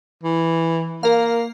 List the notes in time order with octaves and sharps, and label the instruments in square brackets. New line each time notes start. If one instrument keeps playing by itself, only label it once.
[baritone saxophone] E3
[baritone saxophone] A#3 [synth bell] A#4 F5